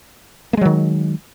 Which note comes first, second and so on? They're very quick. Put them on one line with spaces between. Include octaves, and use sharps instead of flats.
A#3 G#3 F#3 D#3